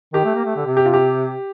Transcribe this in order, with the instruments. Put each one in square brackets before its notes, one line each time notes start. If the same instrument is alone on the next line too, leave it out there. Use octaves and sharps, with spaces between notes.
[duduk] D#3 [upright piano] G4
[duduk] A3
A#3
A3
D3
C3
[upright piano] G4
F4
G4